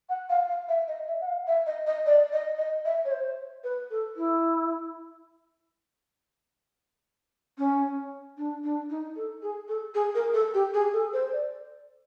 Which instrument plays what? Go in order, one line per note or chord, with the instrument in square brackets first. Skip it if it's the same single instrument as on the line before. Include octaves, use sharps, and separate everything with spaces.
[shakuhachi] F#5
F5
F5
E5
D#5
E5
F#5
F5
E5
D#5
D#5
D5
D#5
D#5
E5
C#5
C5
B4
A4
E4
C#4
D4
D4
D#4
A4
G#4
A4
G#4
A#4
A4
G4
G#4
A4
C5
D5